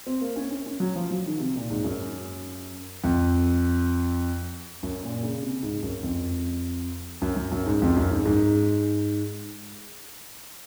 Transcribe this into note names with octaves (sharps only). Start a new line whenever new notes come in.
C4
A#3
C#4
C#4
C#4
F#3
F3
F#3
D#3
C3
A#2
G#2
F#2
F2
F#2
A#2
C#3
C3
G#2
F#2
F2
F#2
F#2
F#2
G#2
F2
F#2
G#2
G#2